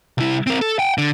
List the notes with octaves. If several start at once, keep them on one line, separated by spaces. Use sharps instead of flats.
C2 E4
C4 A#4
A4
F#5 G5
D3